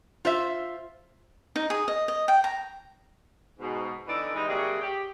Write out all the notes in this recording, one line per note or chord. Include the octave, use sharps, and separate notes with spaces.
F4 C5 E5
D#4
G#4
D#5
D#5
G5
A#5
G#2 B2
D3 E3 B3 D#4 A4 D5
E3 G3 G#3 D#4
C3 F#3 G3 A#3 F#4 G#4
G4